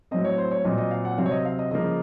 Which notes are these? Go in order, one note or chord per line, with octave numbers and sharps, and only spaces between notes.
A2 F#3 C4 D#5
C#5
C5
C#5
A#2 F#3 C4 D#5
D#5
F5
F#5
C3 F#3 C4 F5
C#5
D#5
F5
D#5
C#3 F3 A#3 D#5